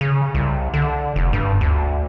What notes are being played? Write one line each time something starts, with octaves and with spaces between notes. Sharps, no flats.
C#3
C2
D3
F1
G2
D2